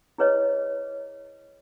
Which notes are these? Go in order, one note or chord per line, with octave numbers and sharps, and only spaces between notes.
E4 G#4 B4 C#5 D#5